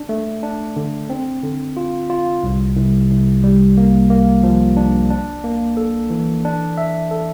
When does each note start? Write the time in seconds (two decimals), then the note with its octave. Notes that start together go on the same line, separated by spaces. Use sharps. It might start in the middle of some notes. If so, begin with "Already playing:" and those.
Already playing: D4
0.09 A3
0.43 D4
0.77 D3
1.10 C4
1.43 D3
1.77 F4
2.10 F4
2.44 C2
2.76 C2
3.10 C2
3.44 G3
3.77 A#3
4.10 A#3
4.44 F3
4.77 D4
5.11 D4
5.44 A#3
5.77 A4
6.10 E3
6.45 D4
6.78 E5
7.11 A4